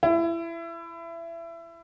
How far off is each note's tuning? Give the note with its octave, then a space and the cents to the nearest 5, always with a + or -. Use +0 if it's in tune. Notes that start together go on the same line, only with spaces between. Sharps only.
E4 +25